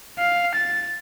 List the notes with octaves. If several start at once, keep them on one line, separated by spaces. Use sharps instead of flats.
F5
A6